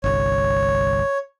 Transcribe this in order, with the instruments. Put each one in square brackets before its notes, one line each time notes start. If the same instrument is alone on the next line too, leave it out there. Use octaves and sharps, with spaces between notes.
[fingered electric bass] G1 C2 [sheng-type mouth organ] C#5